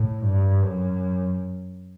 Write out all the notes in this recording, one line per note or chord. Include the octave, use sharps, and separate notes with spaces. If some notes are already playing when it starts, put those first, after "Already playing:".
Already playing: A2
G2
F#2